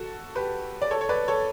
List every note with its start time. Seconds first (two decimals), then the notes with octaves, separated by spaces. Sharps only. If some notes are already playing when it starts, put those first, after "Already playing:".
Already playing: F#4 A4
0.35 G4 B4
0.82 D5
0.91 A4 C#5
1.01 C#5
1.09 B4 D5
1.28 A4 C#5